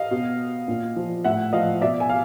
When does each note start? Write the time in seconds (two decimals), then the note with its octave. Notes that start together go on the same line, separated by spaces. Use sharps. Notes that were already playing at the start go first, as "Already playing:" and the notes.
Already playing: D#5 F5
0.11 B2
0.68 A#2
0.96 F3
1.24 A2 E5 F#5
1.53 F3 D#5 F5
1.81 B2 D5 E5
2.00 G#5
2.10 F5